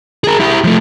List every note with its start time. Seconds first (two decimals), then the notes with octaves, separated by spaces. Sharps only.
0.24 G#4 A#4
0.40 E4 G4
0.64 F3 A3